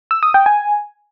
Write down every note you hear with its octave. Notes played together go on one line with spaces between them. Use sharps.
E6
D#6
G5
G#5